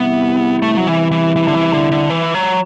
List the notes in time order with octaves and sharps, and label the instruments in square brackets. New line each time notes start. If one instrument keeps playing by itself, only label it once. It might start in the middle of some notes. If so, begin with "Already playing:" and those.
Already playing: [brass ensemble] E2 C3 G3 C4 E4 [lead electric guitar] B3
[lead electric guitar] A3
F#3
E3
E3
E3
D3
E3
D3
D3
E3
F#3